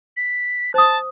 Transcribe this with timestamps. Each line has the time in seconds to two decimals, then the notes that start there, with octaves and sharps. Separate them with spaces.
0.17 B6
0.74 C5 A5 D#6